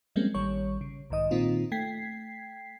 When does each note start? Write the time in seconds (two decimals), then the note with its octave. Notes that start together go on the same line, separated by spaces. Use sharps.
0.16 F3 G3 G#3 A#3 C4 C#4
0.34 A1 D#3 G3 C#5 C#6
0.81 C#3
1.10 B1 G#2 D#3 D#5 D#6
1.31 A#2 D#3 A#3 C4 D#4 F4
1.72 A3 G5 G#6 B6 C7